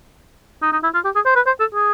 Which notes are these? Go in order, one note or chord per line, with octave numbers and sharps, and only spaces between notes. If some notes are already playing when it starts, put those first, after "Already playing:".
D#4
D#4
E4
F4
G4
G#4
C5
B4
C5
A4
G#4